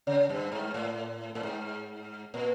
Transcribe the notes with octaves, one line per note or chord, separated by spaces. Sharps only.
C#3
G2
G#2
A2
A2
G#2
A#2